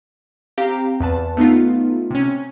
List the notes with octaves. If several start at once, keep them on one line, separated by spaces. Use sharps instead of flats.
C4 G4 F5 A#5
E2 B4 A5
A3 B3 D#4 F4
C3 C#4